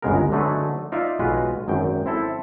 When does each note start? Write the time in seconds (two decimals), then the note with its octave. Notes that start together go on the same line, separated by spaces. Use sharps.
0.02 G1 C#2 F#2 G#3 B3 A#4
0.32 D3 F#3 A3 D#4 G#4 B4
0.92 D#4 F4 D5 E5 F5
1.19 B1 G#3 F4 F#4 B4
1.68 G#1 F#2 G5
2.06 C4 E4 A4